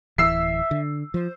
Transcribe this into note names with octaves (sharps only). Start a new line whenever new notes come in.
D1 E3 E5 E6 C7
D3
F3 C5